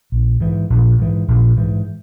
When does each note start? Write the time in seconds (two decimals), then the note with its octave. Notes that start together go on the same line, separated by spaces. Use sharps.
0.12 A#1
0.40 G#2 E3
0.70 A#1
0.99 G#2 E3
1.28 A#1
1.57 G#2 E3